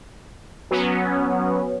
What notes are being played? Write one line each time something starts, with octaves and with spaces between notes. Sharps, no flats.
F#3 B3 C#4